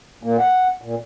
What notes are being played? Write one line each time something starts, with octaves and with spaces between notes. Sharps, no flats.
A#2 A#3
F#5
A#2